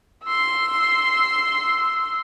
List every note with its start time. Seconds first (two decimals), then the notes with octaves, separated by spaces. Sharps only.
0.24 C6 E6